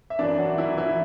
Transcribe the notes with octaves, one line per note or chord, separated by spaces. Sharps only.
E5
F#2 E3 D4 D5
F#3 F#4
E3 E4
E3 E4